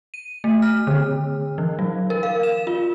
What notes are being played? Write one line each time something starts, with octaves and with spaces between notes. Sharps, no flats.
D#7
A3
F6
D3
E3
F#3
A#4
F5
E7
F4